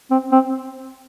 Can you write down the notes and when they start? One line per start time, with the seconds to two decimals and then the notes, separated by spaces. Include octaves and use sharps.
0.11 C4
0.32 C4